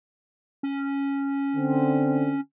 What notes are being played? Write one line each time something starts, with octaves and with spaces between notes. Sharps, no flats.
C#4
D3 C4